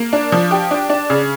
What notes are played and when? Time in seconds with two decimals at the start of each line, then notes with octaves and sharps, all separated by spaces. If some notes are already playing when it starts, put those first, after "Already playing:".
Already playing: A#3
0.13 D4
0.32 F3
0.51 G4
0.71 D4
0.90 D4
1.10 C#3